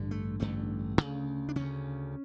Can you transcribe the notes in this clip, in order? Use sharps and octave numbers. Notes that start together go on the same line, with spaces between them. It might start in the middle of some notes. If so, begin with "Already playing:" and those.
Already playing: A1 G2 D3
A3
A1 G2 D3 A3
D2 C#3
D4
D2 C#3 C#4